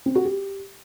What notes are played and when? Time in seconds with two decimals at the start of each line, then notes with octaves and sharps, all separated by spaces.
0.06 C4
0.15 F#4
0.25 G4